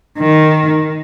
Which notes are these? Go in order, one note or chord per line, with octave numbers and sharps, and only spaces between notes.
D#3